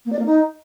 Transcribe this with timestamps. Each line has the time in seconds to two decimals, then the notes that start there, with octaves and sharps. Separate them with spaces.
0.05 A#3
0.12 D5
0.19 A#3
0.26 D#4